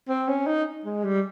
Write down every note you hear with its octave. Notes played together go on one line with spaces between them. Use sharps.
C4
C#4
D#4
G#3
G3